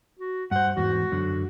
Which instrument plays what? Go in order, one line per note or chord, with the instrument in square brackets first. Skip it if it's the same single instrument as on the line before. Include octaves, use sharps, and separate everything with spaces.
[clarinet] F#4
[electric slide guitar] G2 C5 [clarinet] F#5
[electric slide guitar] E2 G#2 [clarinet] F#4
[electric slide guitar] F#2 D3